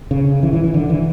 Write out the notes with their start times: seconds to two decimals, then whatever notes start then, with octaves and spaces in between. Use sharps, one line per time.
0.11 C#3
0.43 E3
0.53 E3
0.64 E3
0.74 D3
0.90 E3